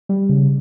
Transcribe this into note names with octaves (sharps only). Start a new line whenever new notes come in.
G3
C#3